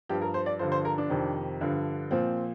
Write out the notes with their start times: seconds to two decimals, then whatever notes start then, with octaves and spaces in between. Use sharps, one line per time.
0.09 G2 F3 G4
0.21 A#4
0.34 C5
0.46 D5
0.59 G2 D3 F3 C5
0.72 C5
0.85 A#4
0.98 D4
1.10 F2 C3 D#3
1.61 G2 D3 F3
2.11 A#2 F3 C4